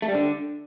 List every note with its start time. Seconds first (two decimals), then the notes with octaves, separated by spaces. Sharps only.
0.02 A3
0.08 G3
0.14 D3